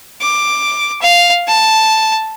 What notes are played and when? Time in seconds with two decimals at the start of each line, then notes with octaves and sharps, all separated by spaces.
0.21 D6
1.01 F5
1.48 A5